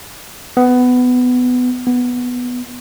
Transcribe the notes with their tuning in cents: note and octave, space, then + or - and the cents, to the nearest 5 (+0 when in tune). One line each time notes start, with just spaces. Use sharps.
B3 +15
B3 +0